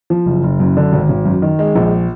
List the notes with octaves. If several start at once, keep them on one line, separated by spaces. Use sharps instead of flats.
F3
F#1
F#1
F#2
D3
G#1
G#1
F#2
D#3
G#3
A#1